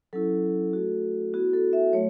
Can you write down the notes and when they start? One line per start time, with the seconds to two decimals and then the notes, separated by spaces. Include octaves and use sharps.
0.13 F#3 C#4 E4 A4
0.73 A3 F#4
1.34 B3 E4 F#4
1.53 A4
1.73 E5
1.93 F#3 A3 C#5